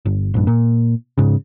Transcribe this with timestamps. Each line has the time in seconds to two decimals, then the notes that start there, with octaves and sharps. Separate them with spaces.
0.05 G1
0.34 A#1 G2
0.47 A#2
1.18 G#2 C#3